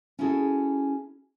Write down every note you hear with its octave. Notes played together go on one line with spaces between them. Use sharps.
C#4 E4 F#4 G#4 A4